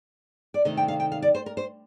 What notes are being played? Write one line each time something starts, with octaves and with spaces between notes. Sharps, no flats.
D5
C3 D#3 A3 D4 D#5
G5
F5
G5
F5
D5
C5
A#4
C5